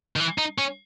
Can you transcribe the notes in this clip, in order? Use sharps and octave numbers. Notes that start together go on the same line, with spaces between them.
D#3
E3
D#4
C#4